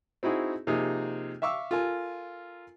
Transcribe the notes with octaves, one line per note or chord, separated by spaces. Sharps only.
C4 D#4 E4 F#4 G#4
C3 F3 A#3 D#4 G#4
E5 F5 C#6 D6 E6
F4 A4 A#4 G#5